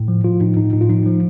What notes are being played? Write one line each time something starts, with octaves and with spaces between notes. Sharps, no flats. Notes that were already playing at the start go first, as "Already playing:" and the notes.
Already playing: A2
F3
F3 F4
A2 D#4
A2 D#4
A2 D#4
F4
F3 D#4
F3